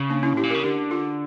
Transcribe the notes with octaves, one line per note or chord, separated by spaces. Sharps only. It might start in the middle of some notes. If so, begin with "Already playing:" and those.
Already playing: C#3
A#3 D4
C#4 E4
A2 E4 G4
A#2
C#3 G4 A#4
D3 G4 A#4
F4 A4